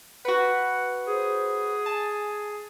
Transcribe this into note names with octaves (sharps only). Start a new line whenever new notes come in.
F#4 B4 F#5
G#4 C5
G#5 A5